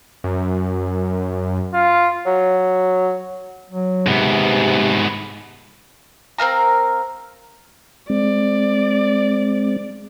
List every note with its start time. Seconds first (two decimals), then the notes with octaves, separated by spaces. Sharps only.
0.24 F#2
1.73 F4
2.26 F#3
3.70 F#3
4.07 G#2 C3 B3
6.38 C4 A#4 F5 A#5
8.10 G#3 C4 D5